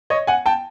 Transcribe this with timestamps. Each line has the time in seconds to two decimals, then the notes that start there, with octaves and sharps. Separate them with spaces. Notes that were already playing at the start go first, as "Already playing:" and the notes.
0.10 C#5 D#5
0.27 F#5 G#5
0.46 G5 A5